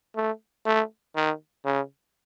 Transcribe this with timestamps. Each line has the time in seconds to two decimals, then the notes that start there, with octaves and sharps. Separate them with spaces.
0.16 A3
0.66 A3
1.16 D#3
1.65 C#3